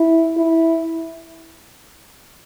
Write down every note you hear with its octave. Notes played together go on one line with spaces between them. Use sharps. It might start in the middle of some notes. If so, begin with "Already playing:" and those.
Already playing: E4
E4